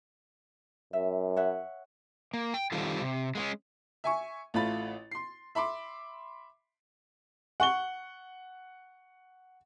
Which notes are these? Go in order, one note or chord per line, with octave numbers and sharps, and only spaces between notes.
F#2 E5
C#5 E5 F#5
A#3
G5
D#3 G3 C4 F4 A4
C3
G#3 A#3 C#4
E5 G#5 C#6
A1 A3 F4 B5 A6
C6 C7
E5 B5 C6 D6
F#5 C#6 G7